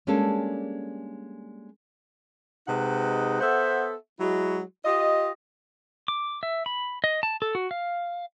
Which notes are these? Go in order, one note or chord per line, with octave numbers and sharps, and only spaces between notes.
G3 G#3 A#3 C#4 D4 A4
C3 G#3 D#4 B4 F#5
B3 A4 C5 E5 F#5
F#3 G#3 E4 F#4
F4 G4 D#5
D6
E5
B5
D#5
A5
A4
F#4
F5